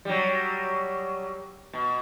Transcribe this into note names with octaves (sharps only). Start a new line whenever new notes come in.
F#3 G3
B2